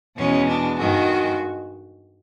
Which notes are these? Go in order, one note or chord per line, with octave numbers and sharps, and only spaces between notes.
E2 B2 G#3 C#4
D4
G2 D#3 G#3 F#4